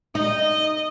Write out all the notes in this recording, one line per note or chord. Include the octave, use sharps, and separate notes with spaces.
D#4 D#5